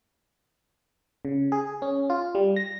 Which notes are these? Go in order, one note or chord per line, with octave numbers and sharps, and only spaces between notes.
C#3
G#4
C#4
F4
G3
A#6